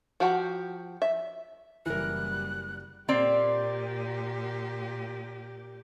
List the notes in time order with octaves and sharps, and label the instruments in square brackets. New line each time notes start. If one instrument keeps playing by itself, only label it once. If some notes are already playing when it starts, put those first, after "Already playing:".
[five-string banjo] F3 F#4 G4 F#5 A#5
E5
[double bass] F#1 G3 [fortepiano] E3 A#4 [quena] F#6
[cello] A#2 G4 [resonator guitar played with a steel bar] A#3 C4 D5